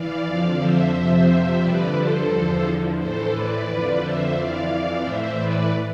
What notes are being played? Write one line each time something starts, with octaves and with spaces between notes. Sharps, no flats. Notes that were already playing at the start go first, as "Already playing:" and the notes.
Already playing: E3 D5 F5
F2 D3 F3
C5 E5
F2 C3 F3
G2 D3 F3 B4 D5
A4 C5
E2 D3 F3
A2 E3 A4 C5
B4 D5
F2 D3 F3
C5 E5
F2 E3 D5 F5
A2 E3 C5 E5
B4 D5